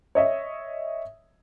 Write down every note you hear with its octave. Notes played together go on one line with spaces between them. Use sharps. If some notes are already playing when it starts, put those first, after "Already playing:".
C#5 D#5 E5